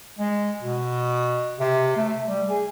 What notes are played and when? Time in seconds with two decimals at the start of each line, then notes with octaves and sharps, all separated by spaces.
0.18 G#3
0.62 B2
1.60 C3
1.97 A3
2.28 G3
2.49 G#4